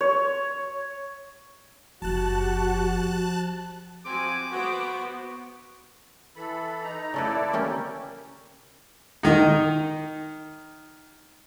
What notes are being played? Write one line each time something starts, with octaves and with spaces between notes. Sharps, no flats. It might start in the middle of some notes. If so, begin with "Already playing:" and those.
C#5
F#1 F3 F#4 G4 A5 F#6
F3 C4 F#4 G#5 D6
B3 F#4 C5
E3 A4 B5
D#4 A#5
C#3 A3 E4 A4 B4 D5
A#3 C#4 G4
D#3 D#4